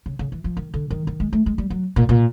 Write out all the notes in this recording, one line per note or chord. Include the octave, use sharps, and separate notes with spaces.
C#3
C#3
E3
F3
D#3
D3
D#3
D#3
G#3
A3
G#3
G3
F#3
A#2
A#2